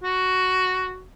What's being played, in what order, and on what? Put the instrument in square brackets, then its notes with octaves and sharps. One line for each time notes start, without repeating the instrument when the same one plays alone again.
[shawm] F#4